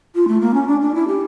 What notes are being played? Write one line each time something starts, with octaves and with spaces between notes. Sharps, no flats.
F4
A3
A#3
C#4
D4
D4
E4
G4